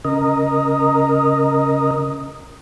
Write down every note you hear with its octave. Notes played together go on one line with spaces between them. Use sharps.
C#3 A#4 D#5